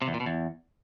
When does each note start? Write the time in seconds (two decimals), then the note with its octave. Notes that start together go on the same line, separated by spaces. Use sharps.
0.02 C3
0.08 E2
0.14 A#2
0.20 B2
0.26 E2